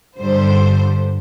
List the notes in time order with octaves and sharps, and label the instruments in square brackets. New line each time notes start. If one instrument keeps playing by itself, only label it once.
[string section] G2 D3 G3 C5